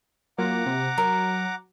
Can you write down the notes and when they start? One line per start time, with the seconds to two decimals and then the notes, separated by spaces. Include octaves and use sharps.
0.38 F#3 A#3 F4 F#5 A#5 D6
0.66 C3
0.98 F#3 A#4